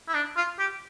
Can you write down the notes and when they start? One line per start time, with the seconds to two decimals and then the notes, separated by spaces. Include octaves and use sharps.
0.08 E4
0.14 D4
0.37 F4
0.59 G4